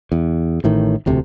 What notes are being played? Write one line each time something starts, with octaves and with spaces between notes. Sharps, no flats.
E2
A1 A2 D#3
E1 D2 C3